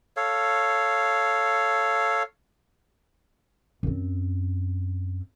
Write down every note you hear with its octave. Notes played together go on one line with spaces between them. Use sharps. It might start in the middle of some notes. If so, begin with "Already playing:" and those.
A4 C#5 F5
F#2 C4